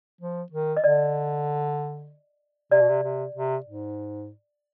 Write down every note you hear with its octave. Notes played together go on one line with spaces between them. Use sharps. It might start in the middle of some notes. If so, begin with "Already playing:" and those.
F3
D#3
D#5
D3 D5
C3 D5
B2
C3
C3
C3
G#2